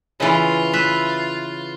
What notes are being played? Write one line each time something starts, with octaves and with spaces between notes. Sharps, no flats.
C#3 E3 F4
B4 E5